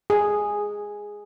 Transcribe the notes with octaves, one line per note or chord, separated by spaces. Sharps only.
G#4